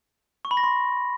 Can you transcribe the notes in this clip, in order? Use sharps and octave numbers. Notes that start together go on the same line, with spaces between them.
C#6
B5
A#6
C6